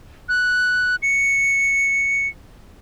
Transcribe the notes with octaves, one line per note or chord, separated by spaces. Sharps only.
F#6
C#7